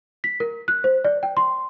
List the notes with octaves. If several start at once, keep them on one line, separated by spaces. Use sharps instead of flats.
B6
A#4
F#6
C5
D5
G5
C6